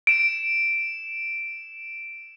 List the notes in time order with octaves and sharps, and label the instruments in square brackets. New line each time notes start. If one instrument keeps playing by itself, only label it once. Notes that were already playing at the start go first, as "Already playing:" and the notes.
[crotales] D7 E7